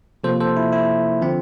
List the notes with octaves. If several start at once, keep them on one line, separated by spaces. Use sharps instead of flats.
C3 F3 A#3 A4 C5
A4 C5
E4
E4
D3 F3 C4